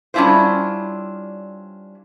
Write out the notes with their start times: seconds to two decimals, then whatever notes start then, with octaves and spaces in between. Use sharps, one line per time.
0.14 G3 C#4 D4 E4 F4 C5